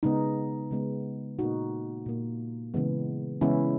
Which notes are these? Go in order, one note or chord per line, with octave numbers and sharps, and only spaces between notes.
C#3 G#3 B3 D#4
C#3 G#3 B3
A#2 A#3 D#4 F#4
A#2 A#3
C#3 E3 G#3 B3
C#3 E3 G#3 B3 C#4 E4